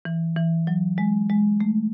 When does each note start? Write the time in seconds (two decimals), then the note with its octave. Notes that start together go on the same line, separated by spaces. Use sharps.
0.05 E3
0.36 E3
0.67 F#3
0.98 G#3
1.30 G#3
1.61 A3